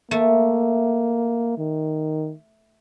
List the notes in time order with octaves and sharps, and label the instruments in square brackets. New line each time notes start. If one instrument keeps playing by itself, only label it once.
[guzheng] A3 [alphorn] A#3
[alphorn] D#3